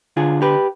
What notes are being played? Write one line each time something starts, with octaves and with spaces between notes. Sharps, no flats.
D3 F4 G#4
G4 B4